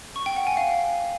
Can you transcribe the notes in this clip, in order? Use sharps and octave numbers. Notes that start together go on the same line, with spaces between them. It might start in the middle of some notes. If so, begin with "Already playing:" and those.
C#6
G5
F#5
G#5
F5